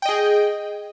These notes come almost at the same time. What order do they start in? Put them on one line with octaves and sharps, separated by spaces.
G5 D#5 G#4